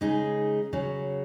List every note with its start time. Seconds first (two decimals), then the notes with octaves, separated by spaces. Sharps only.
0.01 C#3 G#3 D#4 G#4
0.73 C#3 F#3